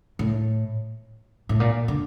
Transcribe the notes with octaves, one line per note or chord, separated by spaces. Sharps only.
A2
A2
A#2
D3